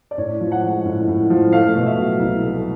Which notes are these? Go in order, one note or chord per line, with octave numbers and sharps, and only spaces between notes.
D5
A2 C#5
F3
F#5
G#3
A2
A2
F3
A3 F5
B2
E5
F#3
C2
A3